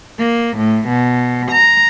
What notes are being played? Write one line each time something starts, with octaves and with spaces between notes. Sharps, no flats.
A#3
A2
B2
A#5